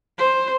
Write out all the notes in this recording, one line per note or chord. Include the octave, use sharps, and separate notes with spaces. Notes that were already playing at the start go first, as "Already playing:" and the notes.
C5